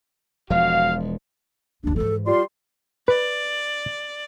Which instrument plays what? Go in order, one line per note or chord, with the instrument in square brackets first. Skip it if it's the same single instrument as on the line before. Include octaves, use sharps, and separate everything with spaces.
[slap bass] E1 F3 G#3 [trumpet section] F#4 F5
[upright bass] G1 D#2 [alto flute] D4
[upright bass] G#2 E3 [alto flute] A4
[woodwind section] G3 D5 C6 [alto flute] F4
[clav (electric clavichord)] B4 [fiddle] D5